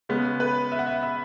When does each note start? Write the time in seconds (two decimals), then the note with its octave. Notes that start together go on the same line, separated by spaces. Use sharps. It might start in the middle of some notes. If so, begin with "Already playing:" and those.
0.09 C#3 G#3 B3
0.40 B4
0.72 E5
0.79 F#5
0.86 E5
1.03 E5